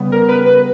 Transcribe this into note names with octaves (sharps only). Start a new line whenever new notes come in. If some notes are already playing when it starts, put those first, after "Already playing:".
Already playing: C#3 G3 B3
A#4
B4
B4